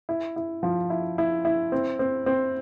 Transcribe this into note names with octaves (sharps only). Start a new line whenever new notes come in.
E4
E4
F3
E4
E4
E4
C4
C4
C4